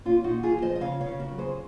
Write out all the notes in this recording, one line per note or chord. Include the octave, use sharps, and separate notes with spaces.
A#2 C#4 F4
D#4 F#4
A#2
F4 G#4
F3
C5 D#5
D#5
C#3 C#5 F5
C#5 F5
C#3
F#4 A#4
F#3
G#4 C5